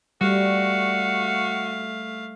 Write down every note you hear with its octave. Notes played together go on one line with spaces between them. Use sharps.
G3 A3 F#4 F5